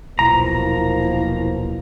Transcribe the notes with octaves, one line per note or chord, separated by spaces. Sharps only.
D#1 B1 B2 F3 A#3 E4 A#5